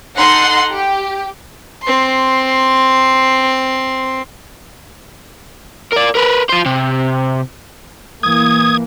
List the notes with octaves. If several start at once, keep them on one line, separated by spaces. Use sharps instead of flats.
D#4 A4 F#5 C6 C7
G4
C4 C6
A#4 D5
A#4 B4
F4 C5
C3
E3 A#3 D#6 G#6